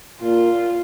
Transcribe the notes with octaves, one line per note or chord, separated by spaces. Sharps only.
A#2 F4